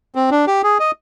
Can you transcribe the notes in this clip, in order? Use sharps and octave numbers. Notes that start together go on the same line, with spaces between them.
C4
D4
G4
G#4
D#5